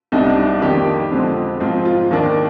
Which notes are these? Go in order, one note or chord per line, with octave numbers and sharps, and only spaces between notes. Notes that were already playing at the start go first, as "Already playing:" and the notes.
C2 C3 G3 D4 D#4
D4
D#4
F2 D#3 A#3 D4 G4
F2 D3 F3 G#3 C4
G#2 F3 G#3 C4 F4
F4
D#2 D#3 A#3 D4